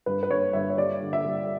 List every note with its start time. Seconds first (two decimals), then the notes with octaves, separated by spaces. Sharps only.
0.06 G2 B4
0.23 B4
0.30 G2 C#5
0.53 G2 E5
0.70 C#5
0.78 G3 D5
1.01 D3
1.13 E5
1.24 G3